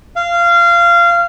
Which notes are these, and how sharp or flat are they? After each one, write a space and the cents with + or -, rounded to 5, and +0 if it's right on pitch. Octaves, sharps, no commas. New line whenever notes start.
F5 -20